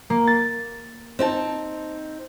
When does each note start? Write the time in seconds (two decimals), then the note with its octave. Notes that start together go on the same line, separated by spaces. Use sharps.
0.10 A#3
0.27 A6
1.19 C4 D#4 A5